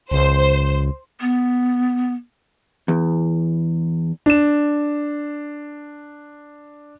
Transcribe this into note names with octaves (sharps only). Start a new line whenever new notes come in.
C#2 C5
B3
E2
D4 E7